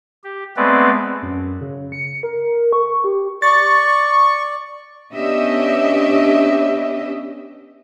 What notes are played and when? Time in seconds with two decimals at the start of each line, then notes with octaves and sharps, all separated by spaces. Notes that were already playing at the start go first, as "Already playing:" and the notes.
0.24 G4
0.56 G#3 A3 B3 C4 B4 D5
1.22 F#2
1.61 C#3
1.92 C#7
2.23 A#4
2.73 C#6
3.04 G4
3.42 D5 C#6 A6
5.13 B3 C#4 D4 G4 D#5 E5